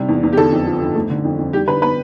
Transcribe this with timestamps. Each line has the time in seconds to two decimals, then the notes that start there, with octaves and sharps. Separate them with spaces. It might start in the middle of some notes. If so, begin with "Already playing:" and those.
Already playing: C3 G3
0.09 E2
0.23 E2
0.33 G4
0.37 D3 A4
0.52 F2
0.67 F3
0.81 G1
0.95 A3
1.10 D3
1.25 F2
1.39 F2
1.53 G3 G4
1.68 D3 B4
1.82 B3 B4